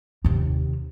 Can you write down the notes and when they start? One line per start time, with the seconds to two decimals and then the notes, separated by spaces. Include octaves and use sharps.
0.24 D#2 C3